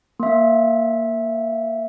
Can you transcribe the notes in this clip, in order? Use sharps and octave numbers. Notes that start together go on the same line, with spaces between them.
A#3 E5